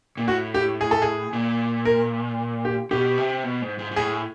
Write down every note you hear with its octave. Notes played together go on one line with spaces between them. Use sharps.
A#2
A2 F#4
G4
G#4
A4
G#4
A#2
A#4
G4
B2 G4
C3
B2
G#2
G#2
G#2
A2 G#4